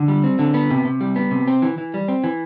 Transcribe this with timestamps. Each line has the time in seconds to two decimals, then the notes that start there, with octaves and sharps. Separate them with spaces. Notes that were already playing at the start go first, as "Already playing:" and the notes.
Already playing: D3
0.08 G3
0.24 C4
0.39 D3
0.54 B3
0.71 C3
0.85 C3
1.01 G3
1.16 B3
1.31 C3
1.48 C4
1.62 E3
1.78 E3
1.94 G3
2.08 C4
2.24 E3